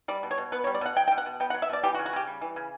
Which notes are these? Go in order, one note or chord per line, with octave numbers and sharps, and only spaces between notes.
G3 D5
B2
C#5
B2
B3 B4
C#5
G3
D5
B2 F#5
F#3 G5
G5
B2
F#5
B2
B3 G5
F#5
F#3
E5
B2 D5
E3 G4
F#4
C#3
F#4
C#3 G4
G3
E3
C#3